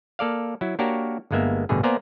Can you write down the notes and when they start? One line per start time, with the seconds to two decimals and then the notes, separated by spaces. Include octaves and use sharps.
0.19 A#3 A4 D5 F5
0.61 F#3 E4
0.79 A#3 D4 F#4 G4 A#4 C#5
1.31 G1 G2 G#3 A#3 B3 E5
1.69 A1 G2 B2 D3 G#4
1.83 A#3 B3 C5 D5 G#5 A#5